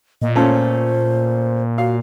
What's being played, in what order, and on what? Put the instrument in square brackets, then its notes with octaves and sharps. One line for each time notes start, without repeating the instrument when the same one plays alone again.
[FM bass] A#2 [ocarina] D#5
[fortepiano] A3 C#4 F4 [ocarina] C5
[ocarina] F#4 [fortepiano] F5